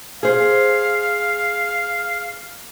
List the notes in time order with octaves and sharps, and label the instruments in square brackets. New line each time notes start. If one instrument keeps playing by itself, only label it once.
[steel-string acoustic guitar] G#4 C5 [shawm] F5